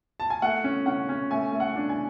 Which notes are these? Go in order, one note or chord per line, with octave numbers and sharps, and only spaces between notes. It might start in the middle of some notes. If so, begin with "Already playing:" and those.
A5
G#5
A3 F#5
C#4
C#4 F#5
C#4
A3 G#5
A3
F#5
D4
G#5